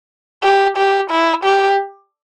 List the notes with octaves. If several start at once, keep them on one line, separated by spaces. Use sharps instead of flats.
G4
G4
E4
G4